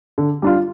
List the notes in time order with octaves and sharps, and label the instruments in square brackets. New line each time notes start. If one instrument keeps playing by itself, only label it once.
[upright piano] D3
G3 D4 F4